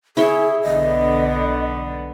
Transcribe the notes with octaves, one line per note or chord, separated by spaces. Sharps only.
E4 G#4 C#5 E5
B1 D3 B3 D#5